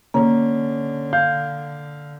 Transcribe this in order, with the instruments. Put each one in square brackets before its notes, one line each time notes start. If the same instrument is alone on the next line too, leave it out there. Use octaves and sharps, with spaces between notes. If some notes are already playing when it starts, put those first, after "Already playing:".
[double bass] D3 [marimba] A#3 [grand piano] C#4
[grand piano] F5 G6